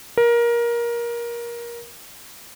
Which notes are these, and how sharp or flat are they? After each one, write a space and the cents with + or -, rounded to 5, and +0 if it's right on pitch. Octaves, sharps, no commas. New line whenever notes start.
A#4 +20